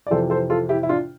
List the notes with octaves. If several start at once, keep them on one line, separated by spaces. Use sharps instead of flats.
D5
F2 C3 E3 A4 C5
A4 C5
F4 A4
E4 G4
E4
D4 F4